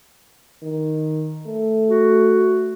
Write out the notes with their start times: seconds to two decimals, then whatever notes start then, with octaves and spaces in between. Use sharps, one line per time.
0.63 D#3
1.47 A3
1.89 F#4